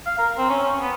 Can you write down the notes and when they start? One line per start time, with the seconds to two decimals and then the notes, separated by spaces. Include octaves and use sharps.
0.06 F5
0.19 A#4
0.38 C4
0.49 C#4
0.63 C#4
0.81 B3